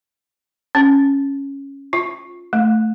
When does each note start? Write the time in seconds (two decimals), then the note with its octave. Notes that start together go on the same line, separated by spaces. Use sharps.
0.75 C#4
1.93 F4
2.53 A3